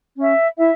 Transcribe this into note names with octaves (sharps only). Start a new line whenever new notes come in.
C#4 E5
E4 E5